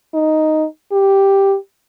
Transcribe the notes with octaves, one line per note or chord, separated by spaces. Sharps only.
D#4
G4